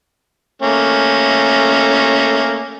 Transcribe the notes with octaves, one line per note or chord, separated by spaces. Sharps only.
A3 A#3 C#4